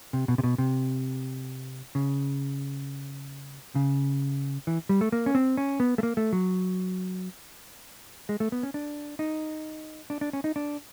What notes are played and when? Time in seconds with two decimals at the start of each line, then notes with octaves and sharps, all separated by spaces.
0.13 C3
0.28 B2
0.38 C3
0.44 B2
0.58 C3
1.95 C#3
3.75 C#3
4.67 E3
4.89 G3
5.01 A3
5.12 A#3
5.26 C#4
5.35 C4
5.57 C#4
5.80 B3
5.98 A3
6.03 A#3
6.17 A3
6.33 F#3
8.29 G#3
8.40 A3
8.52 B3
8.63 C#4
8.74 D4
9.19 D#4
10.10 D4
10.21 D4
10.33 C#4
10.44 D#4
10.56 D4